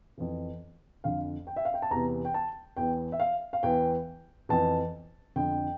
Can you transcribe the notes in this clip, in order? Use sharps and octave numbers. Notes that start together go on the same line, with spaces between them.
F2 E3
F2 D3 F5
G5
E5
F5
G5
A5
E2 C3 E3 A#5
G5
A5
E2 E3 G5
E5
F5
F5
E2 E3 G5
F2 E3 A5
F2 D3 G5